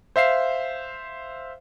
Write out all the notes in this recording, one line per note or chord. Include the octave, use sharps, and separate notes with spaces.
C5 E5 F5 C7